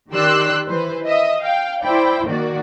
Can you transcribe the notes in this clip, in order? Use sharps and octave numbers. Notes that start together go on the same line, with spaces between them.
D#3 G4 D5 C6 E6 F#6
E3 B4 C5
D#5 E5 D#6
F5 G5
E4 C5 D5 G5
D#3 A#3 F#4 D5